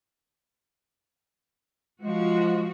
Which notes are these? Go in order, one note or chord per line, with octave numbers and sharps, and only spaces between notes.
F3 G#3 F#4